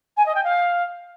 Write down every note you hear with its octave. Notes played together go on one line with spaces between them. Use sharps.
G#5
D#5
G5
F5